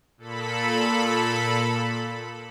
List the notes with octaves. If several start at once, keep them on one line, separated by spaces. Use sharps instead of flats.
A#2 A4 B5